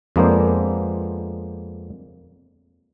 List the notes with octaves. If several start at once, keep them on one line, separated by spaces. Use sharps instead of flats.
F2 G#3 A#3 B3 D4 C5